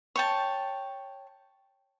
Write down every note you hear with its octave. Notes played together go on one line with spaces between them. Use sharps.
C#5 G5 A5